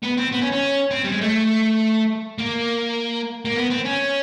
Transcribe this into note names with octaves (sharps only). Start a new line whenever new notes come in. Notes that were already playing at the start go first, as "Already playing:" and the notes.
B3
C4
B3
C#4
C#4
C4
G3
G#3
A3
A#3
A#3
B3
C4
C#4